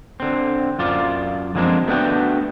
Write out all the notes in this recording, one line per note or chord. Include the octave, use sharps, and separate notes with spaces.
D3 C4
F#2 F4 D5
D3 F3 G#3 A#3 C4 D4
A3 B3 D4 F#4 G5